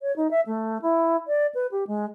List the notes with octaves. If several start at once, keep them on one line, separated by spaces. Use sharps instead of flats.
C#5
D#4
E5
A3
E4
D5
B4
G4
G#3